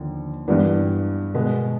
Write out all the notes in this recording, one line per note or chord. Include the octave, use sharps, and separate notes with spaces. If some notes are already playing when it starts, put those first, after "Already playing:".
Already playing: D#2 D3 F3
G2 E3 G3 B3 D4
B2 G#3 B3